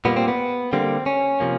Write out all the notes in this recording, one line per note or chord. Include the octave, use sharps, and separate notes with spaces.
A#2 G3 A#3 B3
C4
B3
D3 G3 A#3 C4
C#4
C3 F3 A#3